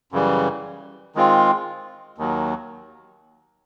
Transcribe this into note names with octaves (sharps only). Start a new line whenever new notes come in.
F#2 C#3 E3 G3
D#3 G#3 C4 F4
D#2 D#3 F#3